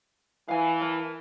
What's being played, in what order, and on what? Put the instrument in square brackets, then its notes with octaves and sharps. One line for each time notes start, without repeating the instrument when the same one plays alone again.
[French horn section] E3 [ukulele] F5 G#5
[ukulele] A#4 A5